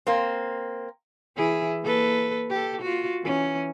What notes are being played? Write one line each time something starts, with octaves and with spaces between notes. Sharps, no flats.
A#3 C4
E3 E4 G#4
A#3 A4 B4
G4 A4
F4 F#4
E3 C#4